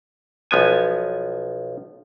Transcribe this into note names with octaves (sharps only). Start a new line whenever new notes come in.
B1 F3 B3 G#5